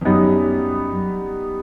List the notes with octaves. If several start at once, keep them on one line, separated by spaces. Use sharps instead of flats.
E2
F#2 G3 B3 D#4